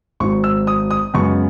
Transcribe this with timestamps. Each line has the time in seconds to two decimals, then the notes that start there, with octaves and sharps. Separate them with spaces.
0.20 G#1 G#2 F#3 C#6
0.44 E6
0.67 D#6
0.91 D#6
1.14 F#2 C#3 G#3 B3 C#6